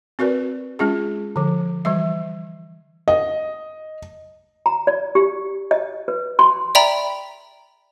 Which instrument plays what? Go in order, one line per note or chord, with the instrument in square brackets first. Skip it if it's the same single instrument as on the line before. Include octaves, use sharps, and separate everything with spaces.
[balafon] C4 F#4 A#4 B4 D5
G#3 C#4 F4 G#4
D3 F3
E3 G3 E5
[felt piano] D#5
[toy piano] A#5
D5
G4
D#5
B4
C6
[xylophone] D5 E5 G5 A#5 B5